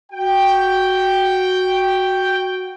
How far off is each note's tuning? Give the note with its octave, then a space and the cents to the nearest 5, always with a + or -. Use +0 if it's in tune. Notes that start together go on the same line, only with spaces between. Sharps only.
F#4 +0 G5 +0